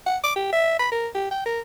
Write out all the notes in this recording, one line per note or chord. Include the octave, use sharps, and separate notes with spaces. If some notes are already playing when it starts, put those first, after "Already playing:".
F#5
D6
G4
E5
B5
A#4
G4
G5
A#4